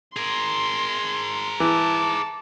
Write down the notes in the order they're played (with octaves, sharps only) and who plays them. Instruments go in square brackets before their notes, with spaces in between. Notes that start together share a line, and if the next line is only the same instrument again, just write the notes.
[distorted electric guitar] G#4 A#4 [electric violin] C6
[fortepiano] E3 [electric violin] A5 [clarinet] D6